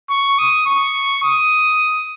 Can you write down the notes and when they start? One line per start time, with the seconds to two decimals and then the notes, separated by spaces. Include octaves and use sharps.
0.10 C#6
0.38 D#6
0.66 C#6
1.23 D#6